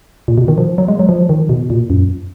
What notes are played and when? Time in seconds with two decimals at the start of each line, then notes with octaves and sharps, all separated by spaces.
0.28 A#2
0.38 B2
0.48 D#3
0.58 F3
0.78 F#3
0.88 G#3
0.99 F#3
1.09 F3
1.29 D#3
1.49 B2
1.70 A#2
1.90 F#2